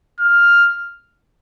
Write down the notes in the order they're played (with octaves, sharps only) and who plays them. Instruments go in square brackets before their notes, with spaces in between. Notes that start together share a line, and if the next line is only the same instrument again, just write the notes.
[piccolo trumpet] F6